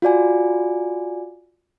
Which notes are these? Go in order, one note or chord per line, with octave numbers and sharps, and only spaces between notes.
F4 F#4 D5 G#5